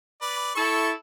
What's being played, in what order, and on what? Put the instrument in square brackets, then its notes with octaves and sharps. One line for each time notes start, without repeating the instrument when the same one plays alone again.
[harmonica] B4 D5
[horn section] E4 A4 [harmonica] C#6